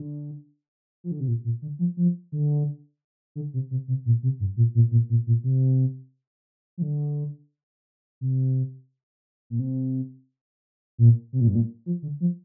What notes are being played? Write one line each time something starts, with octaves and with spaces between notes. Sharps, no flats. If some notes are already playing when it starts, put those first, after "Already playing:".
Already playing: D3
F3
D3
C3
A#2
A#2
D3
F3
F3
D3
D3
C3
C3
C3
A#2
C3
G2
A#2
A#2
A#2
A#2
A#2
C3
F3
D3
C3
A#2
C3
A#2
C3
A#2
G2
A#2
F3
D3
F3